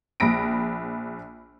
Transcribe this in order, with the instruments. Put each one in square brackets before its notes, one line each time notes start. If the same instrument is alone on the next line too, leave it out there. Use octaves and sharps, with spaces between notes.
[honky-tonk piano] A#1 B5 A#6 D7